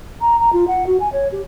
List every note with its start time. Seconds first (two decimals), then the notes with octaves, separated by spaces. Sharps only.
0.21 A#5
0.39 A#5
0.53 F4
0.67 F#5
0.86 F#4
1.00 G#5
1.12 C#5
1.32 G4